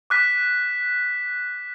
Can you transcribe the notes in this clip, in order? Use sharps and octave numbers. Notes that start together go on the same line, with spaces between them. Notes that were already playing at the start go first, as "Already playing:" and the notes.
D6 F#6 B6